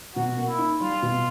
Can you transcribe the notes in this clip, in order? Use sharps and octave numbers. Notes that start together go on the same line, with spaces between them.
B2 F#4
A#3
E4
D#4
G3 F4
B2